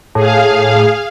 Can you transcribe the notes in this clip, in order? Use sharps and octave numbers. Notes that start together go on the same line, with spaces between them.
A2 G#4 F5